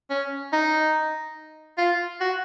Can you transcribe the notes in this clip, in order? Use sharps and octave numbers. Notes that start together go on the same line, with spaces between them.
C#4
D#4
F4
F#4